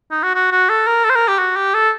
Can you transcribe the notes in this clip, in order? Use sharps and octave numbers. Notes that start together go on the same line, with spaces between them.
D#4
F#4
F#4
F#4
A4
A#4
A4
C5
A#4
G4
F#4
G4
A4